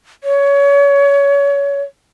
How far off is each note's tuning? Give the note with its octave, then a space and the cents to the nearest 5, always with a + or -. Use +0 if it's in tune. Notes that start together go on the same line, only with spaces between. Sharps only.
C#5 +25